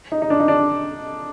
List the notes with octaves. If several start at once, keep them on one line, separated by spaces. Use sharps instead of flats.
D#4
D#4
D4
D#4
D4